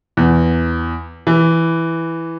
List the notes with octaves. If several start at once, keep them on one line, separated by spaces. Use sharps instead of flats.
E2
E3